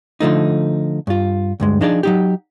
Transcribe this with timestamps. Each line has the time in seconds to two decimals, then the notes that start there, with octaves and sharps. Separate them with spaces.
0.20 D3 F3 A3 D#4
1.07 G2 F4
1.60 D2 G2 G#3
1.81 F3 D4 D#4 G#4 C5 D5
2.03 F#3 D#4 G4